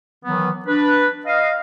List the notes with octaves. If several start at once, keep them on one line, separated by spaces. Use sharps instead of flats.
D#3 E3 F#3 B3
D4 B4
D#5 F5